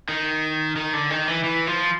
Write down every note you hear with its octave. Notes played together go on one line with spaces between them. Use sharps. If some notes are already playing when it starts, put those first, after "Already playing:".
D#3
D#3
D3
D#3
E3
E3
F3